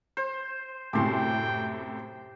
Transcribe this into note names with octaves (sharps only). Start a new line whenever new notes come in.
C5
F#2 A2 C3 G4 G5 C6